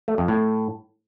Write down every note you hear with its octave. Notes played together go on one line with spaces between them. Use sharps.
A3
F2
A2